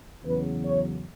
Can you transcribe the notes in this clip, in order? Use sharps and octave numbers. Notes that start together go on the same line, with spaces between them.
E2 C#3 F#3 B4
C#5